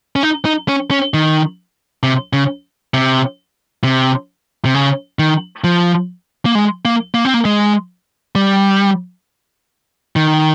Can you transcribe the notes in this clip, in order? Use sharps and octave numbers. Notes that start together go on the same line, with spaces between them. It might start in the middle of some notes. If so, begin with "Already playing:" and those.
C#4
D#4
D#4
C#4
C#4
D#3
C3
C#3
C3
C3
C3
C#3
D#3
F3
A#3
G#3
A#3
A#3
C4
A#3
G#3
G3
D#3